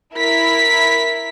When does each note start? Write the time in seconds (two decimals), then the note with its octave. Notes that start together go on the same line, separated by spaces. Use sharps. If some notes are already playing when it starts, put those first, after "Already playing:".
0.15 E4 A#4 B6